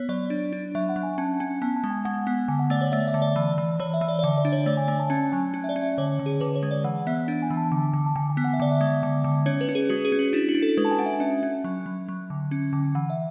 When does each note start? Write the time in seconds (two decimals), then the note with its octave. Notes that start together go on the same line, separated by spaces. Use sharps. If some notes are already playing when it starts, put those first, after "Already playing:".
Already playing: B3 C#5
0.09 F#3 D5
0.30 D4
0.53 D4
0.75 F#3 E5
0.89 F#5
0.96 F#3
1.03 G#5
1.18 C#4 A5
1.40 C#4 G#5
1.62 B3 A5
1.76 A5
1.84 G#3
1.90 G#5
2.05 G#3 F#5
2.27 B3
2.48 D3 G#5
2.59 F#5
2.70 A3 D5
2.81 C#5
2.92 A3 E5
3.08 E5
3.14 D3
3.22 D5
3.36 E3
3.58 E3
3.80 E3 C#5
3.94 E5
4.01 E3
4.08 D5
4.19 D5
4.23 D3 E5
4.38 D5
4.45 D4
4.52 C#5
4.66 A3 D5
4.77 G#5
4.88 A3 G#5
5.00 A5
5.10 C#4 A5
5.32 F#3 G#5
5.54 C#4
5.64 E5
5.69 D5
5.76 C#4
5.82 E5
5.98 D3 C#5
6.19 D3
6.26 G#4
6.41 D3 B4
6.56 C#5
6.63 G#3
6.71 D5
6.84 E3 F#5
7.07 B3 E5
7.28 D4
7.42 G#5
7.50 E3
7.57 A5
7.72 D3 A5
7.93 D3
8.06 A5
8.16 D3 G#5
8.30 G#5
8.37 B3
8.44 F#5
8.53 E5
8.60 D3 D5
8.71 E5
8.81 G#3
9.03 D3
9.24 D3
9.46 C#4 C#5
9.61 B4
9.69 C#4
9.75 G#4
9.89 G#3 F#4
10.05 G#4
10.12 C#4
10.19 F#4
10.33 D4 E4
10.49 F#4
10.55 D4
10.62 A4
10.77 G#3 B4
10.85 A5
10.91 G#5
10.99 D4 F#5
11.06 E5
11.20 C#4 E5
11.43 C#4
11.64 F#3
11.86 F#3
12.08 F#3
12.30 D3
12.51 C#4
12.73 D3
12.95 E3 F#5
13.10 E5